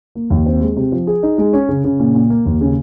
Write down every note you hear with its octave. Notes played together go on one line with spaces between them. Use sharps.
A#3
D#2
C4
G#3
C3
F3
G#4
D#4
G#3
C#4
C#3
C#3
A#2
A#2
A#3
D#2
C#3